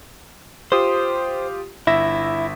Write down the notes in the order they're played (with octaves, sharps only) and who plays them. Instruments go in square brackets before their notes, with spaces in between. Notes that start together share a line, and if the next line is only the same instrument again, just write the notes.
[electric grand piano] F4 G4 D#6 [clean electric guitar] C5
[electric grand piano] G1 E5 A#6 [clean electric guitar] E4